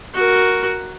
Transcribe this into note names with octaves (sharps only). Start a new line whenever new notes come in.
F#4 A#4